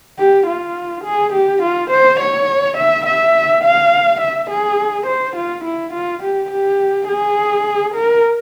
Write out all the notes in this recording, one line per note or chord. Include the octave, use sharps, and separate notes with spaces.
G4
F4
G#4
G4
F4
C5
C#5
E5
E5
F5
E5
G#4
C5
F4
E4
F4
G4
G4
G#4
A#4